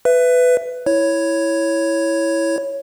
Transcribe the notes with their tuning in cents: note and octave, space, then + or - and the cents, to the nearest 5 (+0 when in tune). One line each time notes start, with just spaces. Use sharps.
B4 +10 E5 +15
E4 +0 C#5 +0